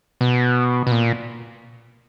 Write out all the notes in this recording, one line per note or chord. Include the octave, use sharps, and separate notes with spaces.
B2
B2
A#2